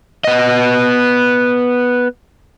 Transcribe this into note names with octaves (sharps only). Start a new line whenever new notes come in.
B3 D#5